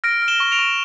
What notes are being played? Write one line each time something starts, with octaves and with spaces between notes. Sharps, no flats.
F6 A#6 D7
F6
E7 G7
C#6
D7 F7
C#6